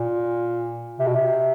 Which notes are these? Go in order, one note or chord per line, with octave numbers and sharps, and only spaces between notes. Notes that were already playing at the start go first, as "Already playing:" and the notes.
Already playing: A#2
C3
B2
C3